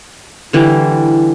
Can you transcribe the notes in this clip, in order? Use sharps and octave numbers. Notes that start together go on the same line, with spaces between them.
D3 E3 G3 E4